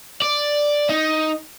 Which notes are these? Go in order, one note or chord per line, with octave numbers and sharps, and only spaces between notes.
D5
D#4